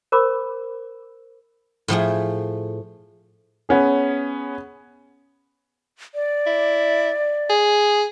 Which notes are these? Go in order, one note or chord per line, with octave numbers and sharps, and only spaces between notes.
A#4 C5 B5 D6
A2 F3 A3 G#4
B3 C#4 G#4
D5
E4
G#4